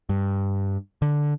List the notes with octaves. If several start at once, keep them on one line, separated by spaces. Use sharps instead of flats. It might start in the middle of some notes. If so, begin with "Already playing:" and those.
G2
D3